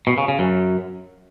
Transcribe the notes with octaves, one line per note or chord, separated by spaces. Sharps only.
B2
C#3
C#3
F#2